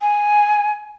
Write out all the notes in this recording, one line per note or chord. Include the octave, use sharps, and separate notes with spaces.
G#5